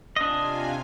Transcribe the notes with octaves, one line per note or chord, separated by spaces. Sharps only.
C3 D4 F4 D#5 G#5